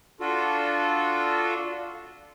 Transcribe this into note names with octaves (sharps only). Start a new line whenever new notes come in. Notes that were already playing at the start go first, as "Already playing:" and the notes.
D4 F4 F#4 A4